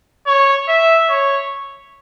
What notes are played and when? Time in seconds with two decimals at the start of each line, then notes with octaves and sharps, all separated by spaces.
0.27 C#5
0.68 E5
1.09 C#5